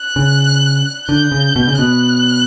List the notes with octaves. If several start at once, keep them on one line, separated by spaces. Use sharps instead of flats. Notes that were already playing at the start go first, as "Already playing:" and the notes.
Already playing: F#6
C#3
D3 G6
C#3
B2
C#3
B2 F#6